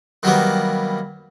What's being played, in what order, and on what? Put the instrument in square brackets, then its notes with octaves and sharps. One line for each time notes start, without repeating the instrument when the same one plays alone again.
[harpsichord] D#3 F#3 G3 A#3 B3